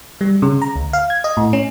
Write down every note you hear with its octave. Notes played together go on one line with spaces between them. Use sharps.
G3
C#3
A#5
D2
F5
G#6
D#5
A2
C#4